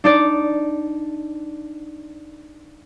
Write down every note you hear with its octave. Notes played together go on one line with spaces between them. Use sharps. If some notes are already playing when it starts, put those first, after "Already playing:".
D4 D#4 D5